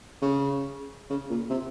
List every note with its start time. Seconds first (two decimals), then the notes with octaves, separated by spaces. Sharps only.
0.22 C#3
1.10 C#3
1.30 A#2
1.50 C3